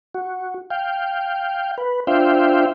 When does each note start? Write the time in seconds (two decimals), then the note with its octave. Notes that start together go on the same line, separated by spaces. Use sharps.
0.15 F#4
0.70 F5 G5
1.78 B4
2.07 D4 F4 C5 E5 F5 G5